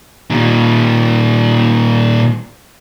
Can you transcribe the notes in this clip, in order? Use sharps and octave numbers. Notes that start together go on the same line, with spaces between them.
A#2 D#3